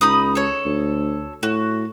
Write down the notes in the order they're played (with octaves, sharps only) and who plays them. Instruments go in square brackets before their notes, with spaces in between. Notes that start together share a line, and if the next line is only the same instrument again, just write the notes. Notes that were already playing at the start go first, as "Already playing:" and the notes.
[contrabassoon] C#2 [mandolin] D#4 B5 D#6
[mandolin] A4 C#5
[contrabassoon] D2
[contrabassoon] A2 [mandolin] F#4